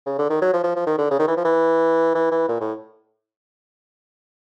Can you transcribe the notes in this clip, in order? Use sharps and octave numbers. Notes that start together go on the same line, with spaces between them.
C#3
D3
D#3
F#3
F3
F3
F3
D#3
D3
C#3
D#3
E3
F3
E3
E3
E3
A#2
A2